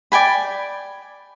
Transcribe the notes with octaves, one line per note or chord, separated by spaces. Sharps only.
D5 G5 G#5 B5